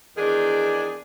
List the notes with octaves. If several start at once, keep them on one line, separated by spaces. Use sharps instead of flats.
E2 D#3 D4 G#4